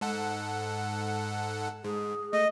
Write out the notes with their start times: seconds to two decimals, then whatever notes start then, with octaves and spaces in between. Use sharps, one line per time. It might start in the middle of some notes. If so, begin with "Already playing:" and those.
0.01 G#2 A4 F#5
1.84 G#2 G#4
2.33 A3 D#5